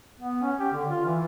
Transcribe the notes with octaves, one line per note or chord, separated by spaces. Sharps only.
B3
C#4
G4
D3
F4
E3